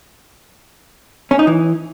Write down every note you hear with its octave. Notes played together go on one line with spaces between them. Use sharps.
C#4
D#4
E3